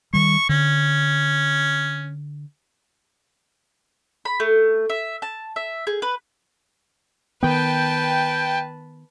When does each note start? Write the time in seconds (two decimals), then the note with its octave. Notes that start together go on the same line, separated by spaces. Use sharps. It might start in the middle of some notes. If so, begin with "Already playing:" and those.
0.13 D#3 G3 C#6
0.49 D3 C#4
4.25 B5
4.40 A3
4.90 E5
5.22 A5
5.56 E5
5.87 G#4
6.02 B4
7.43 D#3 B3 B4 G5 A5